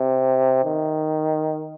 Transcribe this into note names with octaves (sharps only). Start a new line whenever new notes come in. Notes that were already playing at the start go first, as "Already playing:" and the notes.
Already playing: C3
D#3